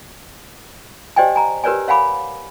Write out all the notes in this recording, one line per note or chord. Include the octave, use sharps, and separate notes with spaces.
G4 C5 D5 D#5 G5 G#5
G#5 A#5
G4 A#4 B4 C#5 D5 G#5
C#5 F5 F#5 G#5 B5 D6